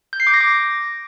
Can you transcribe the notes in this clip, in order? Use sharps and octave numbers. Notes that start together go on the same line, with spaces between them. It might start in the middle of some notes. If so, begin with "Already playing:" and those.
G6
C7
D6
A#6
D6